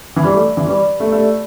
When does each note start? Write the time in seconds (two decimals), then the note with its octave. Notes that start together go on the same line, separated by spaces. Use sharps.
0.16 E3
0.24 G3 G4 B4 D5 B5
0.34 A3
0.57 E3
0.67 G3 G4 B4 D5 B5
1.00 A3
1.12 A3 G4 B4 D5 B5